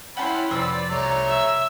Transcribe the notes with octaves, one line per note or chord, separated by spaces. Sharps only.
C#4 E4 F#5 G5 A5 B5 C6
F2 C3 C4 B4 D5 E6
C2 A3 C#5 A#5
E5